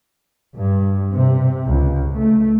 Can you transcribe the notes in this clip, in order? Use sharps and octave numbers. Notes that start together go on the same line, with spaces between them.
G2
C3
C#2
A3